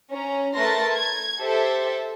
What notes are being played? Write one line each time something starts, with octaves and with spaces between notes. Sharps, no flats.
C#4 A#5
A3 A#4 B4 A5 C6 A#6
G#6
G4 A4 C5 E5